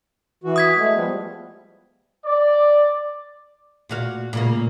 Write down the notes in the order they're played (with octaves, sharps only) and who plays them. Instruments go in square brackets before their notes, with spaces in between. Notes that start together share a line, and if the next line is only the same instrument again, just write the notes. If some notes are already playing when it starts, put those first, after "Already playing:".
[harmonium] E3 F#4
[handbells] D#6 G#6 B6
[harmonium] G#3 A3
F3 G3 B3
[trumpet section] D5
[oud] A#2 F#4 F5
A#2 C#3 A#3